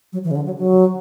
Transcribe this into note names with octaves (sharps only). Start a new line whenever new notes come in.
F#3
E3
C#3
D3
F#3
F#3